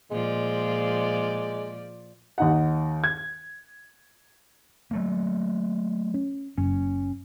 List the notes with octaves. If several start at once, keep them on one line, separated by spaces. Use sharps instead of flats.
A#2 F3 G#3 D5
D#2 D#4 F#5
G#6
F#3 A3 A#3
C#4
F#1 C#4